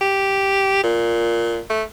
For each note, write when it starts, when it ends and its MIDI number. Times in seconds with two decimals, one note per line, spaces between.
0.01 0.79 67
0.83 1.60 46
1.70 1.83 57